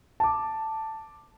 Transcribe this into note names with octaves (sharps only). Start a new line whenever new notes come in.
A5 D6